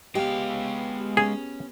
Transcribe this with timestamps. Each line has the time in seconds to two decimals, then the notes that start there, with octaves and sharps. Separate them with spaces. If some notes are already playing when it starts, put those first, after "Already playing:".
0.15 G#3 B3 G4 F5
1.17 C#4 G#4